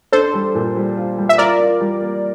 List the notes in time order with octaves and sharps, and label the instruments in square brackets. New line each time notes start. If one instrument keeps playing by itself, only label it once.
[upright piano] D4 [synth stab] A4 C5
[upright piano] G3
A#2
G3
F4
G3
[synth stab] E5
[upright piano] F4 [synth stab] A#4 D5
[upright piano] F4
G3
A#3